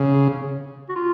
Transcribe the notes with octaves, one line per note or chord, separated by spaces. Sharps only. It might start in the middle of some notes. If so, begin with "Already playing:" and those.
Already playing: C#3
F#4
F4